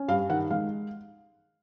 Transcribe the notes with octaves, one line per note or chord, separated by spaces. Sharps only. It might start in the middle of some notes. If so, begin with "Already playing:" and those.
Already playing: C#4
G2 F5
D#3 F#5
G#3 F5